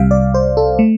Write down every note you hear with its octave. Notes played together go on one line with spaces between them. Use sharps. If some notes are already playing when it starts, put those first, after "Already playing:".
Already playing: C2 C3 G3 F5
D5
C5
A4
A3